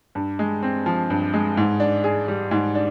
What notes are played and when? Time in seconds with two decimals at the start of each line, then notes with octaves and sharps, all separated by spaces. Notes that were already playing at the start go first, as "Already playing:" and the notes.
0.15 G2
0.39 G#3
0.63 C4
0.86 F3
1.10 G2
1.34 G#3
1.57 G#2
1.80 D4
2.04 G#4
2.28 G3
2.51 G#2
2.75 D4